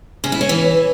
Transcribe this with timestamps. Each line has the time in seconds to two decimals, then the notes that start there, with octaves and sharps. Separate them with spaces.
0.24 C#3
0.32 E4
0.41 C#4
0.49 E3